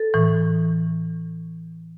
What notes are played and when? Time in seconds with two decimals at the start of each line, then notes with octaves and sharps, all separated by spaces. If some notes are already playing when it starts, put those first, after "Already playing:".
Already playing: A4
0.14 A2 E3